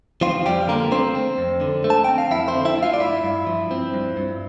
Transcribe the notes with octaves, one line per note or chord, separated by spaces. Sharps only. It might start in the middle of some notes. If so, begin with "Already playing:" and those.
F3 C4 F4
F2 G3 G4
D3 A#3 A#4
A3 C4 C5
C4
F2
D3
A3
A5
C4 G5
F5
F2 E4 E5
C4 C5
D3
E4 E5
A3
F4 F5
D5
G2 E4 E5
G2
F3
C4
G2
G2